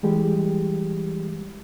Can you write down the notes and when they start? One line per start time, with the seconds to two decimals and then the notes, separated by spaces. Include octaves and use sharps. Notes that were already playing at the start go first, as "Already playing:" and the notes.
0.03 E3 G3 G#3 G4